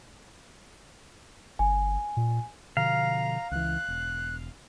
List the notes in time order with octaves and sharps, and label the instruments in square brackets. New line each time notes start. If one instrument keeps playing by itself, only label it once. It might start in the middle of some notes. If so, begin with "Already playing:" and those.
[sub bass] G1 [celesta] G#5
[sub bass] A#2
[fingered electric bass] B2 D3 F3 [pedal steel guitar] F5 [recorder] A#5
[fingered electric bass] C#2 E3 [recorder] F#6
[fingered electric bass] E1